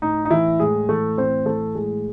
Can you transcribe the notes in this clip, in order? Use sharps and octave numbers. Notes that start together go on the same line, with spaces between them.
A2 D#4
D#4
E3 E4
A2 G#3 G#4
E3 A3 A4
A2 C4 C5
E3 A3 A4
A2 G#3 G#4